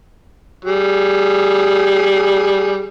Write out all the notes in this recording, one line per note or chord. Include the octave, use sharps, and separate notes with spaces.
G3 G#4